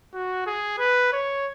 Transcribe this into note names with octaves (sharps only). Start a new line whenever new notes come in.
F#4
G#4
B4
C#5